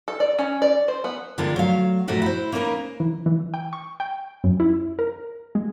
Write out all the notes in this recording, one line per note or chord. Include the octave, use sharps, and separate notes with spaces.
A4
D5
C#4
D5
C5
B3
D3 G3 G#3 B3 F4 A#4
F#3 A3 F5
A#2 F3 G3 A3 F#4 G4
E4 C5
A#3 C#4 D#4 G#4 A#4 B4
E3
E3
G5
C#6
G5
F#2
E4
A#4
G#3